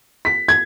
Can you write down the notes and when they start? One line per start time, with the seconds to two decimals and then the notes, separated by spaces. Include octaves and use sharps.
0.25 B6
0.48 G#6